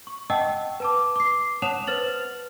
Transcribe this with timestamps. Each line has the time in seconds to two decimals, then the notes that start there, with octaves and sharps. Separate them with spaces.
0.07 C#6
0.30 D#5 F#5 G5 A5 E6
0.80 B4 A5 D6
1.16 D6 C7
1.62 C#5 F#5 A5 D#6 E7 F7
1.87 B4 C5 F6 A6 F#7